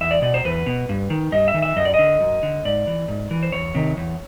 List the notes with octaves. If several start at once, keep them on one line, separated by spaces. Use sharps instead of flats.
E2 E5
D5
B2 D5
C5
E2 B4
B2
G2
D#3
G2 D#5
E5
D#3
E5
F#2 D#5
D5
D#5
D3
F#2
D3
G#2 D5
E3
G#2
E3
C5
E2 C#5
C3 D#3
E2